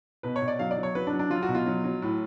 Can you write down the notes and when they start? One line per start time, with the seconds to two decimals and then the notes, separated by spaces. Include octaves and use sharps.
0.23 B2 B4
0.36 C#5
0.42 B2
0.48 D5
0.59 F#3 F5
0.71 D5
0.77 F#3
0.83 C#5
0.95 F#3 B4
1.07 D4
1.13 F#3
1.19 D4
1.30 F#3 F4
1.43 F#4
1.48 B2
1.55 F4
1.66 F#3
1.84 F#3
2.02 A2